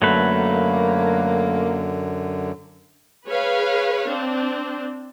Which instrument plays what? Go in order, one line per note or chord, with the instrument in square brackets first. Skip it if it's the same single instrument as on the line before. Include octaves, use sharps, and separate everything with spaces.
[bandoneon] F#2 D3 [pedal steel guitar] F#3 A3 B4 [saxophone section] A#3
[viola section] G#4 B4 C#5 F5
C4 D4